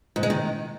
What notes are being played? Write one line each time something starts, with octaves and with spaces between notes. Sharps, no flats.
G#2
G#3
D#3